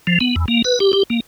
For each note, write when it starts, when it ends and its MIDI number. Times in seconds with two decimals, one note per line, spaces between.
0.07 0.18 53
0.21 0.35 59
0.36 0.46 40
0.48 0.62 58
0.65 0.79 71
0.80 0.92 67
0.93 1.03 67
1.10 1.20 58